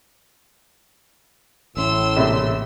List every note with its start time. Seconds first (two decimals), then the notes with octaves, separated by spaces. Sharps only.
1.77 A1 A2 C#4 C6 E6
2.16 A#1 C3 E5